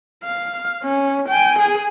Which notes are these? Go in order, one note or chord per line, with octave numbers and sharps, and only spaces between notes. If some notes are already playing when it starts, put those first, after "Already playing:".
F5
C#4
G5 G#5
G#4 G#5